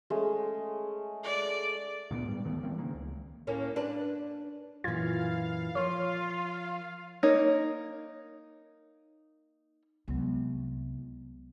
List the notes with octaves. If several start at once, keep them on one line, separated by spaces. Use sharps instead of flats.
G#3 A3 C#4
D5
D2 A#2 G3 B3
G#2 G3
D2 D#3 A3 B3
D#3 E3 G3 C4
C#3 A#3
C#2
A2 A#3 C#4
D4 B4
F#2 A#2 E3 F4 F5 G#6 A6
F3 F4 A#4 C#5
A#3 D#4 C#5
C2 F#3 G#3 B3